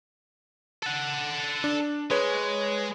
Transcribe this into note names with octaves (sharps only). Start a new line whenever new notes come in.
A4 F#5
D4
G#3 G#4 B4 C#5